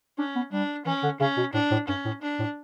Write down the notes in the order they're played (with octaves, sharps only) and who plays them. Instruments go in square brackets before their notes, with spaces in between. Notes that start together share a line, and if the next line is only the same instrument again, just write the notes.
[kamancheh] C#4 [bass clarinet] D4
[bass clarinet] B3
[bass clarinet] G3 [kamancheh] D4
[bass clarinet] E3 [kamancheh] C#4
[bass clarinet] D3
[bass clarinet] C#3 [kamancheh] C#4
[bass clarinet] B2
[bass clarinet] A2 [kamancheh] D4
[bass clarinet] A2
[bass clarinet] G2 [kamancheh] C#4
[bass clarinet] A2
[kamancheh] D4
[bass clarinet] A2